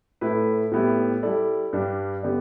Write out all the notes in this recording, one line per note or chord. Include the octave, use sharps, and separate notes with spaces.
A2 A3 E4 B4
A2 G3 B3 E4 G4
G3 E4 A4 D5
G2 G3 D4
D3 B3 G4 D5